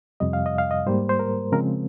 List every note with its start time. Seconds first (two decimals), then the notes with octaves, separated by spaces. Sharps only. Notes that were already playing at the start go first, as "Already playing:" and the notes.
0.20 F2 C3 G3 D#5
0.33 F5
0.46 D#5
0.58 F5
0.71 D#5
0.86 G#2 G3 A#3 C5
1.09 C5
1.19 A#4
1.52 C#3 F3 G#3 C4 A#4